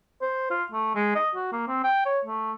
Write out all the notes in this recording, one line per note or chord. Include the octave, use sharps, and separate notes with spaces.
C5
F4
A3
G#3
D#5
F#4
A#3
C4
G5
C#5
A3